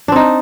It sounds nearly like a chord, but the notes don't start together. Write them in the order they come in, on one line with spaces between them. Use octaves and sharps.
D4 C4 D#4